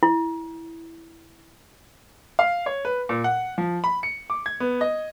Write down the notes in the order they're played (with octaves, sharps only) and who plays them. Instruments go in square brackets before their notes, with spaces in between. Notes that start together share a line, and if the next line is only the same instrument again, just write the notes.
[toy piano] E4
[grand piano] F5
C#5
B4
A#2
F#5
F3
B5
C#7
D6
G#6
B3
D#5